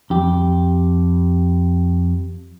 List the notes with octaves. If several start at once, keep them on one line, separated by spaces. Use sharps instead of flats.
F2 G4